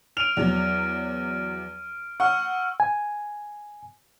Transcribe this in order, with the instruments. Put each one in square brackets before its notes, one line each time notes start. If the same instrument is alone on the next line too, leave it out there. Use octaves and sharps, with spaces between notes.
[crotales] F6 D7 D#7 [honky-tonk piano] F7
[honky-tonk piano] E2 F#3
[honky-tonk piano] F#5 [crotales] C#6 E6 F6
[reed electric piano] G#5